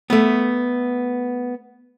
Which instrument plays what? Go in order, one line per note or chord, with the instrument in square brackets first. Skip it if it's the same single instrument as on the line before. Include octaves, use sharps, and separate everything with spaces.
[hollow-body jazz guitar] A3 B3